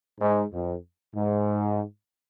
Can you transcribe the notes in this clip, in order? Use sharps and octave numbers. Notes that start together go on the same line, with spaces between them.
G#2
F2
G#2